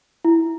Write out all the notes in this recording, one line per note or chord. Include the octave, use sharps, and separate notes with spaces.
E4